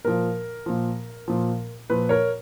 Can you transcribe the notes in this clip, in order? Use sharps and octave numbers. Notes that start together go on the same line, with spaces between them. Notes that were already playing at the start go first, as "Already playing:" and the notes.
A#2 F3 A#4
A#2 F3
A#2 F3
A#2 F3 B4
A#4 C#5